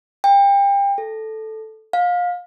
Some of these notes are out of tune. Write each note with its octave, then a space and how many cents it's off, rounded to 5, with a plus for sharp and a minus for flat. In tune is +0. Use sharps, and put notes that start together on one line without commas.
G5 +30
A4 -5
F5 +25